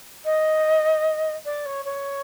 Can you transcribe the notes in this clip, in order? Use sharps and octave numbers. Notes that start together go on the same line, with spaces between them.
D#5
D5
C#5
C#5